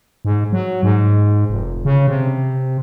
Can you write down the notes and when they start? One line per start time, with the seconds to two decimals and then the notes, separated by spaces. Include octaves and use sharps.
0.25 G#2
0.53 F#3
0.83 G#2
1.50 F1
1.85 C#3
2.08 C3